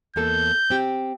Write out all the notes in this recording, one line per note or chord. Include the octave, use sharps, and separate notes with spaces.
E2 A#3 A4 G6
C4 G4